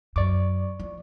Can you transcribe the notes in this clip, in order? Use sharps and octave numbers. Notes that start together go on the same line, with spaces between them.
F#2 D5 C#6 D6
F3